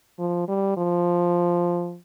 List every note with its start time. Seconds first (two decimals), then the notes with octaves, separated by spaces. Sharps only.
0.19 F3
0.48 G3
0.77 F3